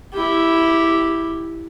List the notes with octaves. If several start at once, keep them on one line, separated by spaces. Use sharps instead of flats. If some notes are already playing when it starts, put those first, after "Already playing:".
E4 G4